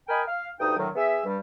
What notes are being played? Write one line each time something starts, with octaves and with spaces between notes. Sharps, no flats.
A#4 D#5 G5 G#5 B5
F5
D2 G2 D#4 G5 D#6
A2 D3 D#3 F#3
B3 G#4 E5
G2 G3